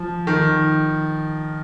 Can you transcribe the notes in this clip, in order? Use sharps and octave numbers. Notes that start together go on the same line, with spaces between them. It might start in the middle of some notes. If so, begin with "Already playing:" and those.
Already playing: F3
D#3